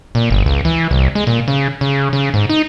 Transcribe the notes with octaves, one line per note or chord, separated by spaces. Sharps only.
A#2
G1
C#2
E3
C2
G#3
A#2
C#3
C#3
C#3
G#2
D#4